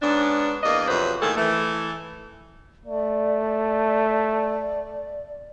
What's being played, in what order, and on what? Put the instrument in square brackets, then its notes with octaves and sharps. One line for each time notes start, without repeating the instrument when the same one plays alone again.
[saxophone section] G#2 B3 C#4 D4
E2 A#3 D5 D#5
F2 C3 F#3 B4 C5
A2 D#3 A#3 G#4 A4
E3 A3
[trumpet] A3 [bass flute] D5